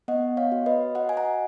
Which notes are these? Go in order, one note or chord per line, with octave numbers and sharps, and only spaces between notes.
B3 D#5 F#5
C#5 F5
F#4
B4 D#5
F#4 D#5 F#5
G#5
F#5 A#5